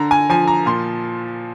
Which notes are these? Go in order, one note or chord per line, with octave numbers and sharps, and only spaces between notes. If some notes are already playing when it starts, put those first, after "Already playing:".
Already playing: D3 A#5
G#5
F3 G#5
A#5
A#2 C6